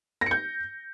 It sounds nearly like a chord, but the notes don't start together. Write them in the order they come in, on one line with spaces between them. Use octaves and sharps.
A#6 C#7 G6